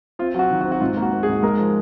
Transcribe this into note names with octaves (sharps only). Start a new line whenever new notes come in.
C4 F4
F#3 F#4
D#3
F#4
C4
F#4
G#2 F4
A#3
F#4
A#3
G#4
G#2
G#3 A#4
F3